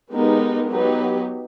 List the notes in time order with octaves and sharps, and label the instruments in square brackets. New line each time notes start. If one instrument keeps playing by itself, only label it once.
[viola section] G#3 B3 D#4 G4 A#4
F#3 B3 D#4 G4 B4